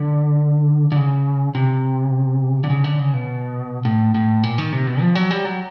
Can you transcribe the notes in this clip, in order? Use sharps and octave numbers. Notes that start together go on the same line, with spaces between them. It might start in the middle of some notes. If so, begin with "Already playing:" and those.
Already playing: D3
D3
C#3
C3
D3
C#3
D3
C#3
B2
A2
A2
A#2
D#3
C3
B2
F3
F#3
G3
F#3